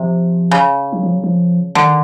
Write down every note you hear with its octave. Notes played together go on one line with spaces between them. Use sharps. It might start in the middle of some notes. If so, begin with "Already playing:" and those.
Already playing: C3 F3
C#3
F#3
F3
F#3
F3
D3 D#3